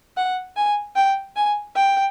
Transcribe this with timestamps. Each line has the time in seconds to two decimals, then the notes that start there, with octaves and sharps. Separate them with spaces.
0.17 F#5
0.57 G#5
0.96 G5
1.36 G#5
1.76 G5